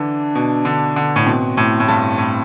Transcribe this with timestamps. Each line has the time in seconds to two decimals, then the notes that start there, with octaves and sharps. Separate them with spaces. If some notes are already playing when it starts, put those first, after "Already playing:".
Already playing: D3 E3 D4
0.35 B2
0.65 D3
0.96 D3
1.16 A2
1.26 B2 C4
1.57 A2
1.80 A2
1.88 G2
2.18 A2